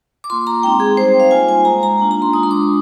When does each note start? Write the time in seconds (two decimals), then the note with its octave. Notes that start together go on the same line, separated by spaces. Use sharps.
0.24 D6
0.30 A#3 F4 C6
0.47 A#5
0.63 G#3 C4 D#4 G5
0.80 G#4
0.97 G3 C4 D#4 C5
1.20 F5
1.31 A#3 F4 G#5
1.49 G#5
1.65 G#3 D#4 A#5
1.83 A#5
1.99 A#3 D4 F4
2.11 A#5
2.22 C6
2.33 G#3 D4 F4 D#6
2.43 C6
2.51 D6